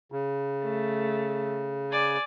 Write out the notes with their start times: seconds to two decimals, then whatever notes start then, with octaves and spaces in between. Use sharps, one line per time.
0.12 C#3
0.64 A3
1.92 D5 G#5